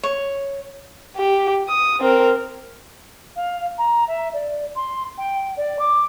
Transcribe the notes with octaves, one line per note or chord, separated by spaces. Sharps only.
C#5
G4
D#6
C4 A#4
F5
A#5
E5
D5
C6
G5
D5
D6